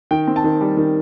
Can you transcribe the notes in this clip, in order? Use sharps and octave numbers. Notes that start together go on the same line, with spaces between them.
D#3 G5
C4
A5
D#3
G3
D#3